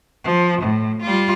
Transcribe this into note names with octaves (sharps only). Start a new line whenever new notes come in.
F3
A2
G3 F4